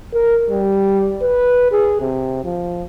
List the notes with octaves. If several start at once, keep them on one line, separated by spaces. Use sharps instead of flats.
A#4
G3
B4
G#4
C3
F3